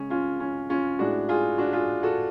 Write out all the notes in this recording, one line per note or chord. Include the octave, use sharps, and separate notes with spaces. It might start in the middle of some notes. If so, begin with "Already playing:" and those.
Already playing: C#3 G#3 C#4
C#4 F4
C#4
C#4 F4
A2 G#3 D4 F#4
F4 G#4
D4 F#4
F4 G#4
F#4 A4